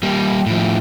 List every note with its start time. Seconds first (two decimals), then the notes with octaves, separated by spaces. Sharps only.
0.03 G3 A#3
0.46 A2 F3